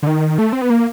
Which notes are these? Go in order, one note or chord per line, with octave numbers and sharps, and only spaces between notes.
D3
D#3
A3
C4
B3
A#3